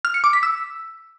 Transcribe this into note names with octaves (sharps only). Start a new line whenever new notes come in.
F6
C#7
D6
B6
E6